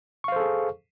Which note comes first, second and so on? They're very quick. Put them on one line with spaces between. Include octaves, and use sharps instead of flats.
C#6 F5 C5 A4 G#4